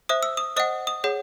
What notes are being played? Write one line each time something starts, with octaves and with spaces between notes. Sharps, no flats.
C5 E5 D#6
E6
D#6
C5 D#5 F#5 D#6
D#6
G#4 C#5 F#5